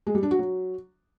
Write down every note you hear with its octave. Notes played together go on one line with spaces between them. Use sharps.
G#3
G3
D4
F#4
F#3